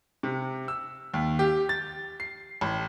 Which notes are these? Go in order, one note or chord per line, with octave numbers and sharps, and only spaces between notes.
C3
E6
D#2
G4
A6
C7
A1